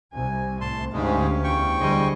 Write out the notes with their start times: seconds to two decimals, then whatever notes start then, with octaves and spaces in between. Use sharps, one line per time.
0.12 C2 G#5
0.61 A2 A5 C6
0.93 D2 G#2 G#3 C#4 G4 F5
1.44 E2 G5 C#6
1.78 D3 G3 G#4 C5 D#5